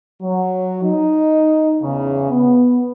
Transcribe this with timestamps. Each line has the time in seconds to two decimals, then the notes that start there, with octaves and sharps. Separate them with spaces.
0.21 F#3
0.83 D#4
1.82 E2 C#3
2.30 B3